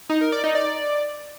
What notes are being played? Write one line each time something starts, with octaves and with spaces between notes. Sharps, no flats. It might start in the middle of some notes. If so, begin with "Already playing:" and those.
D#4
A#4
D5
D#4
D5